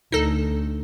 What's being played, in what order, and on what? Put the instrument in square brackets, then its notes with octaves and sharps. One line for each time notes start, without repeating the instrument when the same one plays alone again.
[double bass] D2 [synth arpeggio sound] D#4 A4